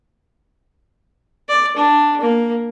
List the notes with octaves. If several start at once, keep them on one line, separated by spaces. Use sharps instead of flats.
D5
D4
A#3